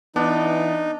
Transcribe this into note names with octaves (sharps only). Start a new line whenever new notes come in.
E3 B3 D4 D#4